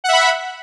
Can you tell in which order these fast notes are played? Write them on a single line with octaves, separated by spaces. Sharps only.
F#5 E5 B5